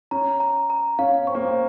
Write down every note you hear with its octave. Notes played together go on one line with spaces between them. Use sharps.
C#4 A#5
A#5
A#5
C#4 F5
C4 C#6
A#3
C4